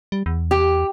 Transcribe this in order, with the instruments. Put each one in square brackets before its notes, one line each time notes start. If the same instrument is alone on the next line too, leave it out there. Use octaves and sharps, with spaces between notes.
[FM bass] G3
E2
[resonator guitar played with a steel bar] G4